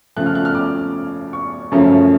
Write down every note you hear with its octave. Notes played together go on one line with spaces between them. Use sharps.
C#3 F3 A3 F#6
F6
F#6
F6
D6
C#6
F#2 C#3 F3 A3 C#4